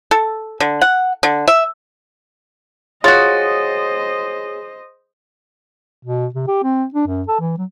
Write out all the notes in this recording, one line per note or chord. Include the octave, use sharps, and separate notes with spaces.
A4
D3
F#5
D3
E5
F4 F#4 G#4 C5 C#5 D#5 A6
B2
C3
G4
C4
D4
F#2
A4
E3
F#3